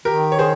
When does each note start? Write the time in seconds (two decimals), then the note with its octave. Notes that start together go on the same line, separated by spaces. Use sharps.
0.05 D#3 G4 A#4
0.32 C#5
0.39 G#4 C5